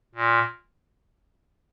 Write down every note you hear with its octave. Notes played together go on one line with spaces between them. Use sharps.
A#2